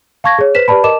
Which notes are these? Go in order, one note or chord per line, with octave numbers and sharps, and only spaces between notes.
F5 A5 C#6 G#6 A#6
G#4 C#5
B4 C5 B6 E7
G4 B4 D5 A5 B5
A#4 D#5 A5 D6 E7